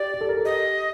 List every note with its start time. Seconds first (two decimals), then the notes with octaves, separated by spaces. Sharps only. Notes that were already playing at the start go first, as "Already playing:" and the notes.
Already playing: G4 D5
0.14 G4
0.21 A4
0.29 A#4
0.37 A4
0.45 G4 D#5